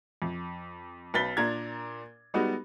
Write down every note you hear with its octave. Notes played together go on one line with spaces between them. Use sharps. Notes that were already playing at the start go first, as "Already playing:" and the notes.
F2
B1 B4 A6 B6 G7
A#2 D4 A#5 G#6
G3 G#3 B3 D#4 F#4